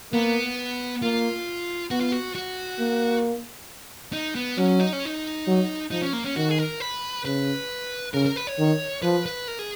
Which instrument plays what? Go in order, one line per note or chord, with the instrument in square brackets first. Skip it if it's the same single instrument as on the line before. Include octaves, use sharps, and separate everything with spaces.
[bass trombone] A#3 [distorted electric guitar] B3
[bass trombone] A#3 [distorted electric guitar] F4
[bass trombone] B3 [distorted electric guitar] F#4
[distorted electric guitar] F4
F#4
F#4
[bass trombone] A#3
[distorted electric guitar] D#4
B3
[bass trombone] F#3 [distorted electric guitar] C#4
[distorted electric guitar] D#4
C#4
D#4
[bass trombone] F#3
[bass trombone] F3 [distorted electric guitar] D#4
[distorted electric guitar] C#4
A#3
C#4
[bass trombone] D#3 [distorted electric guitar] F#4
[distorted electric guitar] G#4
A#4
B4
[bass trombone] C#3 [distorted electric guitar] B4
[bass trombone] C#3 [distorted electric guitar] A#4
[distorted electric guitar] A#4
B4
C#5
[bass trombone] D#3
[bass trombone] F3 [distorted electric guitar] B4
[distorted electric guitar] B4
A#4
G#4